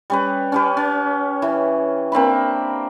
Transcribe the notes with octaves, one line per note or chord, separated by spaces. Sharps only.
G3 C#4 B4
C#4 G4 B4
C#4
E3
A#3 C4 D4 B5